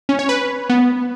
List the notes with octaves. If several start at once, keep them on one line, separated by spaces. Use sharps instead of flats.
C#4
C#5
B4
B3